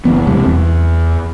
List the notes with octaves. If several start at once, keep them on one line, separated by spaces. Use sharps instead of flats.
F#1 E3 B3
E1 G#2 C3 G3
E2